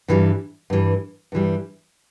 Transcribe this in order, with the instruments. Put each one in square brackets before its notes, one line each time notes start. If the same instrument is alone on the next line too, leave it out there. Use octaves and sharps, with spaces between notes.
[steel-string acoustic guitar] G2 E3 G3
G2 E3 G3
G2 E3 G3